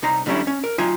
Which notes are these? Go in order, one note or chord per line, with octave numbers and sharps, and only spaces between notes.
C2 D#4 A#5 C6
A2 D3 F#3 G3 C#4 E4
C#4
A#4
F#3 D#4 F4 G5 G#5